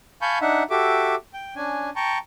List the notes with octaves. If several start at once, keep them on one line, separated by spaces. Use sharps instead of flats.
F5 G#5 A5 B5 C#6 G6
D4 D#4 E5 F#5
F#4 G4 A4 E5 D6
G5
C#4 D4 G#5
G5 A5 A#5 C#6